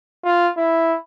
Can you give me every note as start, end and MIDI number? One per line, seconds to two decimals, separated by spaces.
0.25 0.51 65
0.58 0.97 64